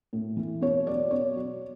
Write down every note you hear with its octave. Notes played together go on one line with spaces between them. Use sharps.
A2
E3
B2 C#5
F#3 D5
B2 C#5
F#3